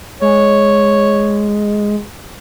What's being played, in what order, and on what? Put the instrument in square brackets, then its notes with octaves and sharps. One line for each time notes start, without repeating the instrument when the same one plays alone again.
[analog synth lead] G#3 [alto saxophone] C#5